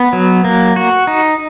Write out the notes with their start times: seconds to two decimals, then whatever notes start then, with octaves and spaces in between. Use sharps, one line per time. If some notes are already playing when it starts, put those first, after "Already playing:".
Already playing: B3
0.13 F#3
0.44 A#3
0.76 F#4
1.07 D#4